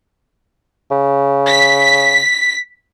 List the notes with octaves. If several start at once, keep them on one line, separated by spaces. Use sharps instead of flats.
C#3
B6